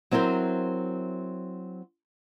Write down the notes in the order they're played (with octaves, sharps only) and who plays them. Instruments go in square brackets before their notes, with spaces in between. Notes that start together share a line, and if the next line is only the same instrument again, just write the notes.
[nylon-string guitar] F#3 C4 E4 A#4 C5